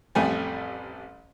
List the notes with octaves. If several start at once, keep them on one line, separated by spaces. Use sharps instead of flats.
A1 F2 G3 A3 G#5